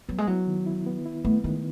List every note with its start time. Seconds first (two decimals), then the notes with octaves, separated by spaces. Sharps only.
0.09 F#3 B3
0.18 G#3
0.27 F#3 E4
0.47 D#3
0.66 E4
0.86 B3
1.06 E4
1.25 A3 B3
1.44 D#3 G#3